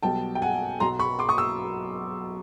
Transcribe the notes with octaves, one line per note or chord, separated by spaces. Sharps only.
B1 B2 G3 G5 A5
G5
F#5 G#5
B1 B2 F#3 A#5 C6
B5 C#6
C6 D6
C#6 D#6
E6